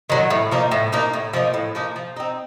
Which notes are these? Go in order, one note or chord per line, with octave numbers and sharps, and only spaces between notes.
D#3 F#3
A2
F3 A#3 D#4
A2
F3 A#3 D#4
A2
F3 A#3 D#4
A2
F3 A#3 D#4
F3
C4 D#4